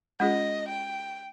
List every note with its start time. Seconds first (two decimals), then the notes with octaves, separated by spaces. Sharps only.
0.20 G#3 C#4 F4 G#4 D#5
0.69 G5